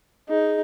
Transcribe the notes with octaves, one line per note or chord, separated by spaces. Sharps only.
D#4 G#4